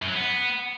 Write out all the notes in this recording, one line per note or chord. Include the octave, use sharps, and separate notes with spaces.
F#2
F#3
B3